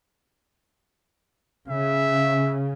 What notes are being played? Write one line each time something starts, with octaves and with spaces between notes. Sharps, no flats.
C#3 E5